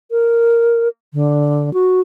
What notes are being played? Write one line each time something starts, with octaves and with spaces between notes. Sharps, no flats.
A#4
D3
F#4